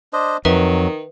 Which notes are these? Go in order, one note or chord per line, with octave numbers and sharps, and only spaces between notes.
D4 C5 D#5
F2 D#3 F#3 B4 E5